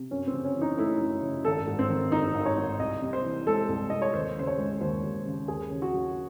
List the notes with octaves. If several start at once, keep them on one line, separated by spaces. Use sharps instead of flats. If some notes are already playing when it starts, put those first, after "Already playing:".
Already playing: C3
F#2 C#4
C4
C#3
C#4
E3
D#4
A3 E4
F#2
C#3
G#1 A4
G#2
C4
D#3
G#1 D#4
G#1
C#5
G#2
C2 D#5
C3
C5
E3
G#3 A4
C2
C3 D#5
C#5
D#2 C5
C#3 C5
C#5
G#3
D#2 C5
D#2
C#3
D#2 G#4
C#3
F#4
F#3